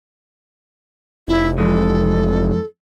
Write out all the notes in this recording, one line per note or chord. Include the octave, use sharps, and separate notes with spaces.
F1 E4
F2 E3 G#3 A4